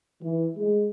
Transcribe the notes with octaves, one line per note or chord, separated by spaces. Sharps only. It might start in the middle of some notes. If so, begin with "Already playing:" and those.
E3
G#3